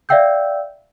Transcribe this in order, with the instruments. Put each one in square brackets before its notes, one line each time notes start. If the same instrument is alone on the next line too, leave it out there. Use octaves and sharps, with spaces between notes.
[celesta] D5 E5 F5 G5 E6 G6